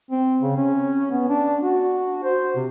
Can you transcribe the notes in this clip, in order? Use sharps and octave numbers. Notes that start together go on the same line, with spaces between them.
C4
C#3
C#4
B3
D4
F#4
C5
C3